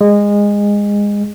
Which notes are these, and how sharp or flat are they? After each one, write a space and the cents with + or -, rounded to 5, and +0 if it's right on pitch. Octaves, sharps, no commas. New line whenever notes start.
G#3 -20